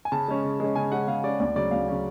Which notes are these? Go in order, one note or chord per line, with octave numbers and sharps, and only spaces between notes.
G#5
C#3 A5
G#3 C#4
C#3
G#3 C#4
C#3 G#5
G#3 C#4 F#5
C#3 F5
G#3 C#4 D5
D2 D5
C#3 F#3 C#4 D5
D2 F5
C#3 F#3 C#4